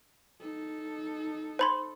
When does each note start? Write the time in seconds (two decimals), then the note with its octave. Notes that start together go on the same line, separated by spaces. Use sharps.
0.41 D#4 A4
1.59 C5 B5 C6